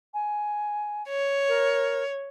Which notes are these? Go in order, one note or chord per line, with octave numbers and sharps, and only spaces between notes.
G#5
C#5
A#4